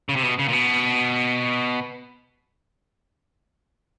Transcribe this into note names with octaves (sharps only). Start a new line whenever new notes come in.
C#3
C3
B2
C#3
A#2
B2